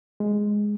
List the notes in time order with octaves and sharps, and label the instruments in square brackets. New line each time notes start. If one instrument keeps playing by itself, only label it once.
[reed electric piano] G#3